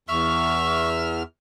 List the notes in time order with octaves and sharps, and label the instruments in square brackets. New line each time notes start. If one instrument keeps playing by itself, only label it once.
[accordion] E2 F6 [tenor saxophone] E5 [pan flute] C#6